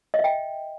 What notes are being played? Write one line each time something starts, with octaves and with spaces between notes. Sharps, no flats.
D#5
E5
G5